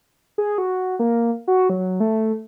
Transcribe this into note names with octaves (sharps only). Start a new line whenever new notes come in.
G#4
F#4
A#3
F#4
F#3
A3